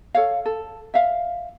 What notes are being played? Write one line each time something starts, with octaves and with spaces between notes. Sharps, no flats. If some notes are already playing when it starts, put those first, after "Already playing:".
A4 C#5 F5
A4
E5 F5